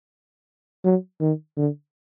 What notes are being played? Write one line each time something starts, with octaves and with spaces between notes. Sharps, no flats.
F#3
D#3
D3